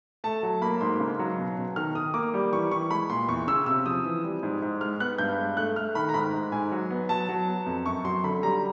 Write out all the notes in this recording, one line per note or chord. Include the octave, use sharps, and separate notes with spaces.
A3 A5
F#3
A#3 B5
G#2 C6
C#3
F#3
B2
B2
D#3 F6
D#3 D#6
A#3 D6
G3
E3 C#6
E3 C#6
G#3 B5
A#2 C6
E2 C#6
C#3 E6
C3 E6
F3 D#6
E3
G3
G#2
G#2
G#3 F6
B3 F#6
G2 G6
G#3
A3 F#6
A3 F6
D#3 B5
A#5
G#2 B5
G#2
G#2 G#5
F#3
B3
F#3 A5
F#3
B3
F2
F#2 C#6
F#3 C6
D3 B5
G3 A#5